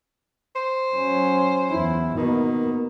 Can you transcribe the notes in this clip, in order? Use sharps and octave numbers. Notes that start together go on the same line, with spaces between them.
C5
F#3 C#4
E2 E4
B2 D#3 A#3